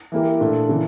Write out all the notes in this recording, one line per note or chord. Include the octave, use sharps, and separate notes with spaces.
E3 A#3 E4 G4 A#4
A#2 A3 D4
C#3 E3 A#3